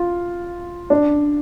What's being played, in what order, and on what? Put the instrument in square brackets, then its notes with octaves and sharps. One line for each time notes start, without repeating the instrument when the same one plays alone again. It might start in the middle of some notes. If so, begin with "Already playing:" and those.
Already playing: [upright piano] F4
D4